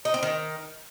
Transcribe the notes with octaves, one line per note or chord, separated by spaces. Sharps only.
D#4
C4
D#3